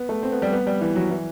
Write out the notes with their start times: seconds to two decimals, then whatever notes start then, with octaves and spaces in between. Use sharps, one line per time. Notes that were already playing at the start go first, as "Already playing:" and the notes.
Already playing: B3
0.09 A3
0.23 C4
0.32 B3
0.42 G3
0.53 B3
0.67 G3
0.81 E3
0.96 F#3
1.11 E3